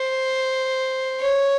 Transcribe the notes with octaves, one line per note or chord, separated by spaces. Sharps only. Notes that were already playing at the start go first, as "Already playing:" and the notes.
Already playing: C5
C#5